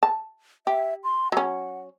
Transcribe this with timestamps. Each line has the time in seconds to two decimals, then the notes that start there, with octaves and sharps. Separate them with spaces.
0.03 A5
0.67 G4 E5
1.04 C6
1.32 F#3 C#4 F#5